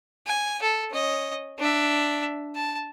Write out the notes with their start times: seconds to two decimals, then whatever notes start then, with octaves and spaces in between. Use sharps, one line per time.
0.26 G#5
0.62 A4
0.91 C#4 D#5
1.59 D4 E5
2.55 A5